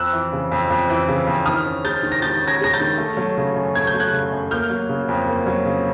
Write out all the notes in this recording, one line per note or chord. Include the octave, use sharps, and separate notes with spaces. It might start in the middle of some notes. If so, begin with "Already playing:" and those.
Already playing: F2 E6 F#6
E3
C#3
F2
F2
E3
C#3
F2
D#3 D#6 F6
C#4
G#3 G6 A6
D#3
A#6
D#3 G6 A6
C#4
G#6 A#6
G#3 A#6
G6 A6
D#3
A3
F#3
C#3
F#2
A3 G#6
G6
F#3
F#6 G#6
C#3
F#2
A#3 F6 G6
F#3
C#3
F2
A#3
F#3
C#3